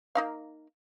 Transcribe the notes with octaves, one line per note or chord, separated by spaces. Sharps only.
A#3 D#4 F5